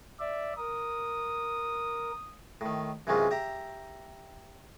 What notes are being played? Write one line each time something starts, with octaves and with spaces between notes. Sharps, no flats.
D5 E5
A#4 D#6
A2 D#3
F#2 C3 E3 G#3 C#4 F4
G4 E5 G5 A#5